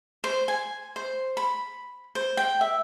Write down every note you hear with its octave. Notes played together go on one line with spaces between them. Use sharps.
C5
G#5
C5
B5
C5
G5
E5